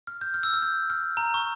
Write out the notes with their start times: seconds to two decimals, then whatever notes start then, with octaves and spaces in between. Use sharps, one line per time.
0.07 F6
0.21 G6
0.34 F6
0.43 E6
0.54 F6
0.62 G6
0.90 F6
1.17 A#5
1.34 C#6